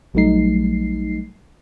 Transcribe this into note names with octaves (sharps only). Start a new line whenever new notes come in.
A#1 F#3 G3 A3 D#4 C7